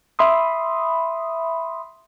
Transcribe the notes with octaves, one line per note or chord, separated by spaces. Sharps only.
E5 B5 C6 D#6